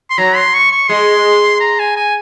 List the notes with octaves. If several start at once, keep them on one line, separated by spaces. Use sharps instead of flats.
C6
F#3 A#5
C6
C#6
C#6
G#3 C6
A#5
G#5
G#5